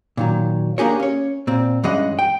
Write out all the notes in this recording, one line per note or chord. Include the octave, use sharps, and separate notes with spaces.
A#2 D#3 F#3
A#3 D4 G4 G#4 A#4 C#5
C#4 C#5
A#2 C4
G2 E3 G#3 C#4 D#5 F#5
G5